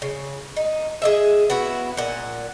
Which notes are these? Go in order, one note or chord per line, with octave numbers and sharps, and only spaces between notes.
C#3
D#4
G#4 D#5 E5
B3 E4 F#4
A#2 F#5